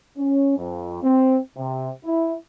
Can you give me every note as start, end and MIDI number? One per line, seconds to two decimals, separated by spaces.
0.18 0.54 61
0.57 1.00 41
1.03 1.37 60
1.57 1.89 48
2.04 2.34 64